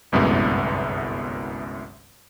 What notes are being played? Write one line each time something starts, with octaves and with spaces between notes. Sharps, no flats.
G1 C2 F#2 A2 G#3 B3